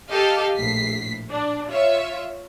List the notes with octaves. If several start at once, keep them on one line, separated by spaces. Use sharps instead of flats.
G4 A4 D#5 F5
A#1 A2 B6 C7
D4
F4 C#5 E5